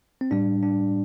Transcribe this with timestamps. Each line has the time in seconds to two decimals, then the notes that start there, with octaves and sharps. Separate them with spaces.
0.21 C4
0.31 A2 G3 D4
0.63 D4